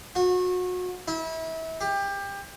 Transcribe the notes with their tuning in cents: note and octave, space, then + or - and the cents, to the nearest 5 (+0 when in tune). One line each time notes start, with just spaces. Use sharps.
F#4 -30
E4 -30
G4 +25